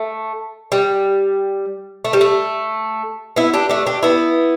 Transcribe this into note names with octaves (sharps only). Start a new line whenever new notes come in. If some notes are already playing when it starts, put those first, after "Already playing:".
Already playing: A3
G3
A3
G3
A3
B3 E4
D4 G4
A3 D4
D4 G4
B3 E4